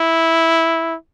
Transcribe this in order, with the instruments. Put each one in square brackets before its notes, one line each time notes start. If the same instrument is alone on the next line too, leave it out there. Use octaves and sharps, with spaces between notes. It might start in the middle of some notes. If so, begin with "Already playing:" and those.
Already playing: [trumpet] E4